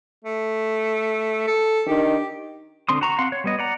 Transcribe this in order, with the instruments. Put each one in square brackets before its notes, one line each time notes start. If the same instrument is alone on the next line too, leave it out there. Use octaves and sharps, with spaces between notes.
[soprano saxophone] A3
A4
[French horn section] D#3 D4 [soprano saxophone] G4
[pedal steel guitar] D3 C4 C6 D#6
F#4 A#5 C#6
C4 F5 F#5 C6
C#5
G3 B3 D#5
D5 F#5 A#5